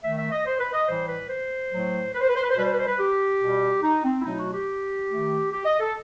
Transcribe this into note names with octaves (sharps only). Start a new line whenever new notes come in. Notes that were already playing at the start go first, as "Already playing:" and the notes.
D#3 A3 E5
E5
D#5
C5
B4
D#5
A2 E3 G3 C5
B4
C5
A2 F#3 A3
B4
C5
B4
C5
B4
C5
B2 G3 B4
C5
B4
C5
B4
G4
B2 G3
D#4
C4
E4
B2 F#3 A3 D#4
E4
F#4
G4
D#3 A3
G4
D#5
A4